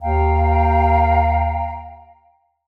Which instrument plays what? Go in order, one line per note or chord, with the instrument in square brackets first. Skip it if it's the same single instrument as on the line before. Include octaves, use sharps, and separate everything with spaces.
[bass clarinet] D#2 [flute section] F5 G5 A#5